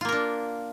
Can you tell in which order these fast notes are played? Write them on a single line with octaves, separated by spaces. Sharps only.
F4 A#3 A#4 D4